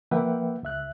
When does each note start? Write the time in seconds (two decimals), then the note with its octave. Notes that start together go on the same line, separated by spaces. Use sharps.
0.11 F3 A#3 B4 E5 F#5 G5
0.63 C#2 E5 F#6